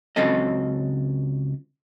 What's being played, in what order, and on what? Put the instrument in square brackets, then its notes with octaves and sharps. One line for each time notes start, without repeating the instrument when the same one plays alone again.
[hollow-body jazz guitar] C#2 C#3 F#3 C4 A4 D#5